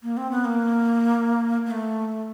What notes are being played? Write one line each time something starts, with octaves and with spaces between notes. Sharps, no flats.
A#3
C4
B3
A#3
A#3
A3